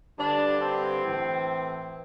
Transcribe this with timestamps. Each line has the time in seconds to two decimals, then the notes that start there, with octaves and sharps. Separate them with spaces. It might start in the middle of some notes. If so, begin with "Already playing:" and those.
0.19 G2 D3 D4
0.61 C4
1.03 A2 E3